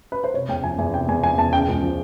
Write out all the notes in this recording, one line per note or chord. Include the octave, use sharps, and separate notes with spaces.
B4
C5
C3 C#5
E2 G5
F3 G#5
E2 G#5
C3 G5
E2 G#5
F3 G#5
E2 A5
C#3 G5
C#2
F3